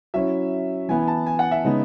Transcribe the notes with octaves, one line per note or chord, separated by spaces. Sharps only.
F#3 C#4 E4 E5
E3 B3 E4 G#5
G#5
A5
G#5
F#5
E5
C#3 G#3 B3 D#4